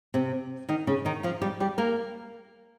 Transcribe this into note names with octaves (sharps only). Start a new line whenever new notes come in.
C3 C4
D#3 D#4
C#3 C#4
D#3 D#4
F3 F4
G3 G4
G3 G4
A#3 A#4